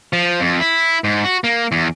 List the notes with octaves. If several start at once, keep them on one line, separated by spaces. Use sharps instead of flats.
F3
F2
E4
G#2
F#4
A#3
E2